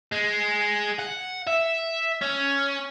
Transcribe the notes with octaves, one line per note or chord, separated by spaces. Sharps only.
G#3
F#5
E5
C#4